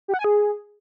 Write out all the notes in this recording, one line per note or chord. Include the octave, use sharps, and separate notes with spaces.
G4
F#5
G#5
G#4